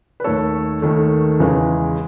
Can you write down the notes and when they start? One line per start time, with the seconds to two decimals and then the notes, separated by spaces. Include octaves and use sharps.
0.20 B4
0.24 D#2 D#3 A3 A4 C#5
0.82 D#2 D#3 A3
1.40 E2 C#3 E3 G#3